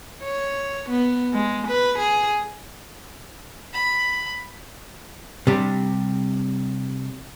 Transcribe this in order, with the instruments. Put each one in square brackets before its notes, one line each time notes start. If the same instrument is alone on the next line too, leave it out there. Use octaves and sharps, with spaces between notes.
[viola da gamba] C#5
B3
G#3
B4
G#4
[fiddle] B5
[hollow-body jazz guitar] C3 G3 D4